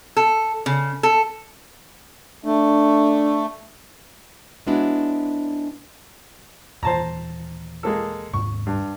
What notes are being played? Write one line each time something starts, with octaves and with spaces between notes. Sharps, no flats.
A4
C#3
A4
A3 D4
G#3 B3 C#4 D4 E4 F#4
D#2 A#2 E3 C5 A5 A#5
G#3 A#3 A4
D#1 D#2 G#2 C#6
G2